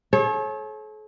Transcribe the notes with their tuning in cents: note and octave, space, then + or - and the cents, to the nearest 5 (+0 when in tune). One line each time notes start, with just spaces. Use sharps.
A4 -45 C#5 -35